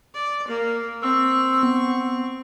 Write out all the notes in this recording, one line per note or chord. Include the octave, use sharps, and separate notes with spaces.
D5
A#3
C4 C#6 E6
B3